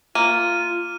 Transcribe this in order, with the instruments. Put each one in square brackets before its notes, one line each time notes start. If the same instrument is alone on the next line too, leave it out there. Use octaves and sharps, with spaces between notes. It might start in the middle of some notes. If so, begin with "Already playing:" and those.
[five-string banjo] A#3 [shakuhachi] F4 [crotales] F6 D#7